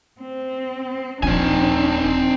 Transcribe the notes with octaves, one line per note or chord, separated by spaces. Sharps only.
C4
D#1 F3 C4 D4 D#4 G#5